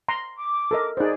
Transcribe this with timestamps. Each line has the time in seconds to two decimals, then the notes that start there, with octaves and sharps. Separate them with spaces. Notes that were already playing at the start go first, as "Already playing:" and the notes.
0.08 A#5 C6
0.36 D6
0.71 A4 A#4 D#5
0.97 D#4 G#4 C5 D5